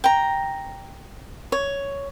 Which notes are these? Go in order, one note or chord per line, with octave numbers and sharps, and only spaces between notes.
G5 A#5
C#5